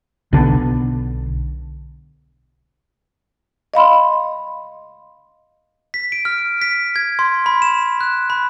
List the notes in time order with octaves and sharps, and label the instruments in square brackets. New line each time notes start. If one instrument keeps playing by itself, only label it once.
[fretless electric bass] B1 D3 B3 D4
[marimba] D#5 F5 B5 C6
[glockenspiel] B6
D7
F6
B6
G#6
C6
B5
E7
F#6
B5